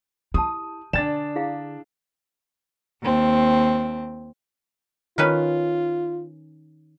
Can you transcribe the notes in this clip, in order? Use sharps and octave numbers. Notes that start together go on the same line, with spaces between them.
E4 G4 A5 D#6
D3 D4 D5 G5 G#5 A6 E7
E4 G#4 F5
D#2 C4
D#3 C#4 F4 B4